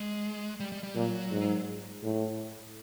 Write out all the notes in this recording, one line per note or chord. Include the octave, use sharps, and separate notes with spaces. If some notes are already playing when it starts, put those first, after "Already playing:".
Already playing: G#3
G3
G3
G3
A#2 F#3
G#2
A2